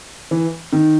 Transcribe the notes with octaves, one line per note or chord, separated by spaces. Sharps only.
E3
D#3